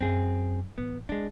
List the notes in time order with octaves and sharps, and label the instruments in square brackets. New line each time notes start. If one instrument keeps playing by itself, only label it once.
[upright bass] F#2 [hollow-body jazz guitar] C4 G#4
[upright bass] A2 E3 [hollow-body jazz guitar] B3
[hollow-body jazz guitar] G#3 D4 [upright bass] E4